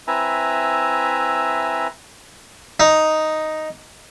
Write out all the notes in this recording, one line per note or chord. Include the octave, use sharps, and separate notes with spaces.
C4 E4 B4 E5 G#5 A#5
D#4